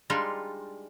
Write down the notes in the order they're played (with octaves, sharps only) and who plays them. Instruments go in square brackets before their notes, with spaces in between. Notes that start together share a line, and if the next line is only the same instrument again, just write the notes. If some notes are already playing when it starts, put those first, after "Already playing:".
[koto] G3 G#3 D4 D#4 F4